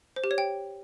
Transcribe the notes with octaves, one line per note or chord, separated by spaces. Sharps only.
C5
G4
C#5
G5